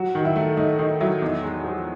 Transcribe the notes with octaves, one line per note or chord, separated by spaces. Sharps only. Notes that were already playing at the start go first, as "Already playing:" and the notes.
Already playing: F#3 F#4
D#3
E4
A3
A3 D#4
D#3 D#4
F#3 E4
E2 D#4
G#3
F3